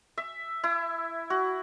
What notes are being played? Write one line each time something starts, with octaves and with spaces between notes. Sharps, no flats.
E5
E4
F#4